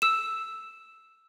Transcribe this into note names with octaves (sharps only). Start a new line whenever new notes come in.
E6 E7